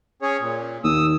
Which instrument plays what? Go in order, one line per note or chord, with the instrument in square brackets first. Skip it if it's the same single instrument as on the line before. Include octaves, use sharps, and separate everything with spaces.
[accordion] C#4 G#4 C#5
A#2
[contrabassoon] D#2 [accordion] D#6 E6